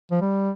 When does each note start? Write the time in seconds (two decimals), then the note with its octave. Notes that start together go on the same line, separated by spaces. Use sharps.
0.11 F3
0.22 G3